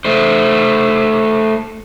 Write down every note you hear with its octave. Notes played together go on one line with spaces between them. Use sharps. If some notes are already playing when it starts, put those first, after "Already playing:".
A3 C5